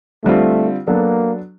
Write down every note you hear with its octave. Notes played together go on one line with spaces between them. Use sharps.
D3 G3 A3 C4 F4
F#3 A#3 B3 D4 F#4 A4